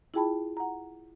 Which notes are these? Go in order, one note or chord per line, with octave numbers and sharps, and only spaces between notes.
E4 F4 G#4 G5 A5 B5
F#5 A#5